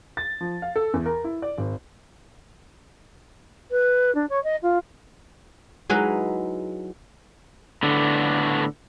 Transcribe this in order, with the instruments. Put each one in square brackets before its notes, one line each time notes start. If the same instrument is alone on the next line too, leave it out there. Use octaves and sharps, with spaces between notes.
[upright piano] A6
F3
F5
A4
E2
A#4
E4
D5
G#1
[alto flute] B4
D4
C#5
D#5
F4
[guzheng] F#3 G#3 D#4 E4 B4
[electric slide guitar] A2 B3 D4 [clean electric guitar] D3